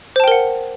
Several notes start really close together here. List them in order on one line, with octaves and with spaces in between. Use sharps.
C5 A5 G5 A#4 F#5